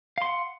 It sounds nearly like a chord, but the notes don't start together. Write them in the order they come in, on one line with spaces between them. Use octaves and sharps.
F5 C6 F#5